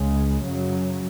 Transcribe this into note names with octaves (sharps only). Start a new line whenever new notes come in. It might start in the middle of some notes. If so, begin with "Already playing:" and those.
Already playing: C#2 C#3 G#3
F#2 C#3 F#3